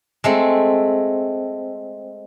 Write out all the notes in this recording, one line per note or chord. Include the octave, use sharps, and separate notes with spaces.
G#3 A3 C4